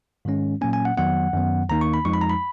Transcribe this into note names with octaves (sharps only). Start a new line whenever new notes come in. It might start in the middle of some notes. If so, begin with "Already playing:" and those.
G#2 D#3 G#3 C#4
A#2 F#3 A#3 C#4 G#5
G#5
F#5
F2 D#3 F#3 B3 F#5
F#2 D#3 F#3 B3
D#2 D#3 A#3 D#4 A#5
C#6
B5
F2 F3 G#3 D#4 C#6
B5
A#5
B5